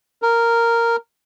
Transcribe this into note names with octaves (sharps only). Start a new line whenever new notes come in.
A#4